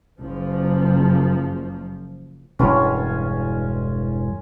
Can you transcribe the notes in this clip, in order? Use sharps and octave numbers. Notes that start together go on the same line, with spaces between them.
F#1 F3
E1 G2 E3 C#4 F4 C#5